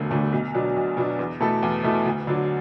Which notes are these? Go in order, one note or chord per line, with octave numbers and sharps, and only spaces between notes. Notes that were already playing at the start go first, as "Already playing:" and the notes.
Already playing: E1 D2 D3 A3
D2 D3 A3
B1
B2 F#3 D4
B1
B2 F#3 D4
E2
B2 A3 E4 A4
E2
B2 A3 E4 A4
D2
D3 F#3 D4